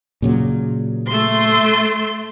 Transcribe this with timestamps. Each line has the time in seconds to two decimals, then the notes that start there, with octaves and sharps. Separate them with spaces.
0.22 A#2 C#3 F#3
1.07 A3 C6